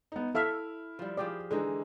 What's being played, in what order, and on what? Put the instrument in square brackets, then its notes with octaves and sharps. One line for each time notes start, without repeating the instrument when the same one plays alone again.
[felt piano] B3 D#4
[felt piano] E4 F6 [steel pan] A4 E5 F5
[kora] F3 G3
[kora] F3 G4 G#4 [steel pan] D5
[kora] D3 E3 D#4 [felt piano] G#3